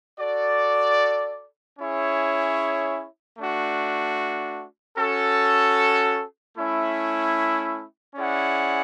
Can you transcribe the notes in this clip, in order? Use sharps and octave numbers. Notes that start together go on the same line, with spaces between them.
F#4 A4 D5
C#4 E4 G#4 C#5 E5
A3 D4 F#4
C#4 F#4 A4
A3 C#4 E4
C#4 E4 G#4 D5 F#5